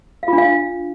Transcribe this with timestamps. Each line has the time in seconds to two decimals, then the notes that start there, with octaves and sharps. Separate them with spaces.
0.23 F5
0.28 F4
0.33 D4
0.38 F5